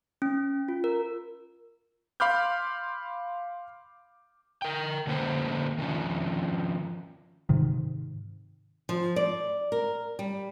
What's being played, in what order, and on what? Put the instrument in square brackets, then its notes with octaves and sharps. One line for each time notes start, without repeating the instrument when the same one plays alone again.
[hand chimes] C#4
F4
A#4
[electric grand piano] F5 B5 C6 D6 F6 G6
[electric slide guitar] A#4 G5
D3 F#3 A#3 C#4 B4 C5
D#3 F3 C#4
[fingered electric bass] G#2 C3 D#3
[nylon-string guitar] F3
D5
A#4
G3